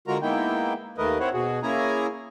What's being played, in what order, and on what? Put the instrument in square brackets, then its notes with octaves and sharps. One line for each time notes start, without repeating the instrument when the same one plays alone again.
[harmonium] D3 G#3 F4 F#4 A#4 A#5
G#3 A#3 B3 D#4 E4 G5
D#2 D#3 A3 A#4 B4 D#5
C4 E4 C5 C#5 F#5
B2 F#4 G#4
A#3 C#4 E4 G#4 G#5 A#5